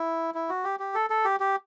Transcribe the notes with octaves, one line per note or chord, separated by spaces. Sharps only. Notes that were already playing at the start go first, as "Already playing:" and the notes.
Already playing: E4
E4
F#4
G4
G4
A4
A4
G4
G4